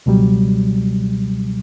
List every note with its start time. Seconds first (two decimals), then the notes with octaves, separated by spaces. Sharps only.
0.06 C#2 B2 F#3 G3